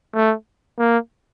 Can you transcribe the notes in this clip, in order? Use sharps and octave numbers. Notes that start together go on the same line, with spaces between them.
A3
A#3